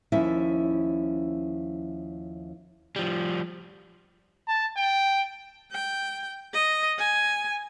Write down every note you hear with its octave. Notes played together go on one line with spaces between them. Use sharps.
D#2 F3 C#4 E4 E5
F3 G3
A5
G5
G5
D#5
G#5